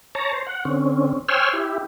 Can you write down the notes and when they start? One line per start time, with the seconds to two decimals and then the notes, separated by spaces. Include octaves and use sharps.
0.15 C#5 A5 A#5
0.33 C5
0.47 F#5
0.65 D3 C4 C#4
1.29 C5 C#5 G5 G#5 E6 F6
1.53 E4 G4